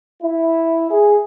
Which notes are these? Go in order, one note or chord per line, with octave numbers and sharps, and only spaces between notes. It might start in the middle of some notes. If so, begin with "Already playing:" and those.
E4
G#4